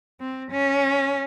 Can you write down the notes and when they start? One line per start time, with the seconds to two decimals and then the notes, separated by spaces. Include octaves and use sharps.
0.20 C4
0.51 C#4